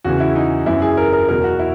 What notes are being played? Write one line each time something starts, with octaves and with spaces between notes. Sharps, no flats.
E2 C#3 E3 F#4
E4
D#4
F#2 E3 E4
G#4
A#4
A#4
E2 B2 F#3 A#4
F#4
E4